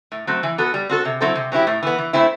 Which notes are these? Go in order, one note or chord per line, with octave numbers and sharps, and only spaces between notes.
A2
F#3 A3 C4
E3
B3 F#4 A4
G3
C4 F#4 A4
C3
F#3 C4 E4 A4
C3
F#3 C4 E4 G4
A2
E3 B3
E3
A3 C4 E4